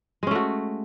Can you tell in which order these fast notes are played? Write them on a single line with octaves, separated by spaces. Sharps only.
G#3 C#4 A3 F#4